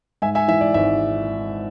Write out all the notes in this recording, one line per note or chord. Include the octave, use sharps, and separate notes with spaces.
G#2 E5 G#5
E5 G#5
E3 E5
D5
G#1 E5